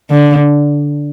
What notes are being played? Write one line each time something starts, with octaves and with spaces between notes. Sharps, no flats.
D3